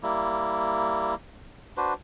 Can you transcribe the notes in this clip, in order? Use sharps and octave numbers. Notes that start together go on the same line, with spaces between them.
G3 A#3 E4
D4 F#4 B4 C5